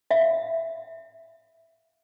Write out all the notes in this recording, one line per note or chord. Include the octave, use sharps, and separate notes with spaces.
E5 F5